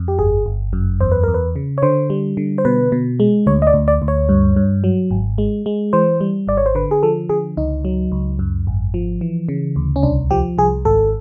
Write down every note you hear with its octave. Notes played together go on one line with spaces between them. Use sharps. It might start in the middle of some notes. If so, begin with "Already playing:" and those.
Already playing: F2
G4
G1 G#4
G1
F#2
E2 C5
B4
E2 A#4
B4
C#3
C#5
D3 C5
G3
D3
C5
B2 B4
B2
G#3
D2 C#5
D#5
D5
D2
D5
D2
C#5
G2
G2
F#3
G#1
G#3
G#3
E3 C5
G3
G#1 D5
C#5
C5
D3 B4
G#4
F3 A4
D3 G#4
C#2 D#4
F#3
C#2
F#2
G#1
F3
E3
C#3
D2
C#4
C2 D4
F3 G4
C2 G#4
G#1 A4